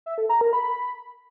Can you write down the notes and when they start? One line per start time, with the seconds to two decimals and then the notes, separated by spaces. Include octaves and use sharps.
0.06 E5
0.18 A4
0.29 A#5
0.41 A#4
0.53 B5